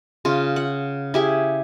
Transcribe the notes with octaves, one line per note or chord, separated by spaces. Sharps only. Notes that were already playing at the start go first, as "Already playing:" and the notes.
C#3 F4
F#5
E4 G4 G#4